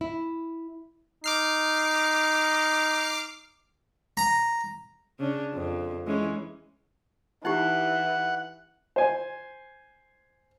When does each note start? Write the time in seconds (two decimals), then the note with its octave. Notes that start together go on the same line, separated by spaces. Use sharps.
0.01 E4
1.24 D#4 D6 F6 C7
4.17 A#5
5.19 C#3 C#4 D4
5.54 F2
6.07 E3 G#3 C#4
7.45 E3 D#4 E4 G4 F#5
8.96 C5 G#5